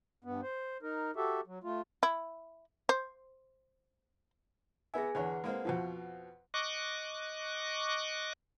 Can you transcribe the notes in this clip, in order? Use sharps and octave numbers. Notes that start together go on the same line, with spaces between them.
G2 B3
C5
D#4 A#4
F#4 G4 A4 E5
F#3
A3 F4
E4
C5
B3 G#4 E5 G#5
E2 D3 B4 C#5 F#5
G#3 A#3 C4
F2 B2 F3
D#5 C#6 D6 F#6